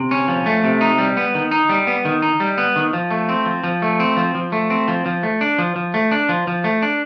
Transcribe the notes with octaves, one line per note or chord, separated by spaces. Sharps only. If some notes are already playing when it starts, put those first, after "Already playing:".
Already playing: C3
C#4
F3
A3
C3
D#4
G3
B3
D#3
D#4
G3
B3
D#3
D#4
G3
B3
D#3
F3
A3
C4
F3
F3
A3
C4
F3
F3
A3
C4
F3
F3
A3
D4
F3
F3
A3
D4
F3
F3
A3
D4